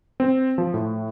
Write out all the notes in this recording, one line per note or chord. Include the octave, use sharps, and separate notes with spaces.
C4
F3
A2